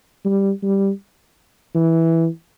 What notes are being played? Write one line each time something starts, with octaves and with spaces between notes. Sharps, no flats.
G3
G3
E3